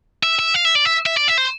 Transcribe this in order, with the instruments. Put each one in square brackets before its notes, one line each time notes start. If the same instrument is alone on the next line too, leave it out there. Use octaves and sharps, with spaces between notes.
[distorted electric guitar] E5
E5
F5
E5
D5
E5
E5
D5
E5
C5